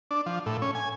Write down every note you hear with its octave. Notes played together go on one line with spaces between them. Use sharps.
D4
F3
A2
C#4
G#5